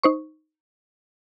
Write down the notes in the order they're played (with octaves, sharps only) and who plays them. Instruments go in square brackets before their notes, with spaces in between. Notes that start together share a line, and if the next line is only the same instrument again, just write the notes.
[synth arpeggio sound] D#4 C5 C#6